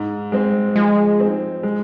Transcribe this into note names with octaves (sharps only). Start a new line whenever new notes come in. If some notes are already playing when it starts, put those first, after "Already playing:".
Already playing: G#2
G#3 C4
F3 G#3
C4 D#4
G#3